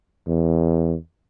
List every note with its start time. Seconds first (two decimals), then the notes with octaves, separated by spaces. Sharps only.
0.27 E2